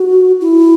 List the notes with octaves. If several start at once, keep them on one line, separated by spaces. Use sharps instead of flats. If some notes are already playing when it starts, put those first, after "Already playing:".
Already playing: F#4
E4